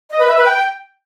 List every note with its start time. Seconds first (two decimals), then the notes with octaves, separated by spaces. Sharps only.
0.11 D#5
0.20 B4
0.29 E5
0.37 B4
0.46 G5